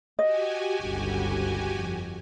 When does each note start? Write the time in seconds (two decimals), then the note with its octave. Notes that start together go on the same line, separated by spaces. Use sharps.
0.19 F#4 G4 D#5 G#5
0.83 G1 C#2
1.78 F2